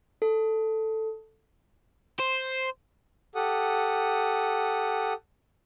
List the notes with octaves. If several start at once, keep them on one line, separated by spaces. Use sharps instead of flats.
A4
C5
G4 A4 F#5 D#6